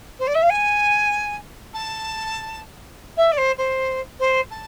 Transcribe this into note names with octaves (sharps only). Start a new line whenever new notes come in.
C5
D5
E5
F5
G#5
A5
E5
D5
C5
C5
C5
A5